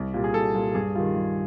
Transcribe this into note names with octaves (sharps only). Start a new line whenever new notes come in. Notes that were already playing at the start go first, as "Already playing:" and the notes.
Already playing: C2
A#2 G3
G#4
C2 A4
A#2 G3
G2 G#4
D#3 G3 F4
G2